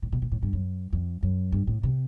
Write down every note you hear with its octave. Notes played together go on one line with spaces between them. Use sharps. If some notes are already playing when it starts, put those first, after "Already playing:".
A2
B2
A#2
A2
G2
F#2
F2
F#2
G2
A2
C3